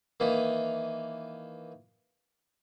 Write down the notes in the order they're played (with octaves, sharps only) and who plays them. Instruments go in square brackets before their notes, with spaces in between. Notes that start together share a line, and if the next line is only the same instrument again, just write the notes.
[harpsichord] D#3 E3 A#3